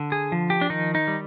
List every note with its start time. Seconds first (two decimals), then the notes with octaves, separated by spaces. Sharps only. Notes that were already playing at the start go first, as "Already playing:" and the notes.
Already playing: D3
0.12 G#4
0.32 F3
0.50 G4
0.61 D4
0.70 D#3 D#4
0.95 D#4
1.08 G3